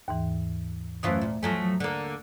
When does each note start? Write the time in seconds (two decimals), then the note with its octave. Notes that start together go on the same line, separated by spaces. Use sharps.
0.08 D#2 G#2 E3
1.03 F#2 E3 A3 F4 C5 D#6
1.21 A#2
1.43 F3 F#3 A3 G#5
1.80 D3 A#3